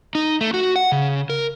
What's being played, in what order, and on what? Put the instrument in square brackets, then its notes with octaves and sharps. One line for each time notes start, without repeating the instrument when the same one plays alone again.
[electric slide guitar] D#4
A3
F#4
F#5
C#3
A#4